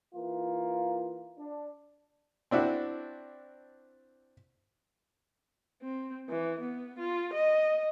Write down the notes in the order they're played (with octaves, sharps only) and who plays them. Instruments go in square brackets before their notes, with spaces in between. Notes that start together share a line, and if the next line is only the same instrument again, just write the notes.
[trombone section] E3 A#3 F4
D4
[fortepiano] C4 D4 E4 F#4
[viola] C4
E3
B3
F4
D#5